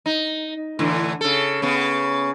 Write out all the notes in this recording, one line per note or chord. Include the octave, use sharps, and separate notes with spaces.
D#4
A2 D3 E3
C#3 A4
C#3 B3